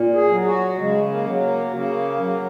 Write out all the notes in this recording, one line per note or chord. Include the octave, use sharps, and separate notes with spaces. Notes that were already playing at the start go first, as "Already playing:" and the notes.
Already playing: A#2
G#4
F#3
F#4
C#3 G#3
A#3
F#3
A#3
C#3 A#3
F#3